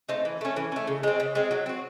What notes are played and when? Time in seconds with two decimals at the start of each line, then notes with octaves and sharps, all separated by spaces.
0.09 A3 C4 D#4
0.25 E3
0.41 A3 C#4
0.56 E3
0.72 A3 C#4
0.87 C#3
1.03 G#3 C4
1.20 C#3
1.35 G#3 C4
1.51 F#3
1.66 C4 F#4